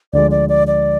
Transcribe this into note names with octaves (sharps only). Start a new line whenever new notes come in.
D2 D3 F3 G#3 D5
D5
D5
D5